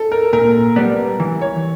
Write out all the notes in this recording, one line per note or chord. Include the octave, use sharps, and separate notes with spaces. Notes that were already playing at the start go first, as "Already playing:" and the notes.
Already playing: A4
A#4
A#2 A#4
G3 B3 D5
E3
C#5